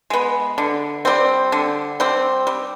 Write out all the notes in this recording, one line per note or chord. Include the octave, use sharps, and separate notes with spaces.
G#3 B3
D3
G3 C4
D3
G3 C4
G3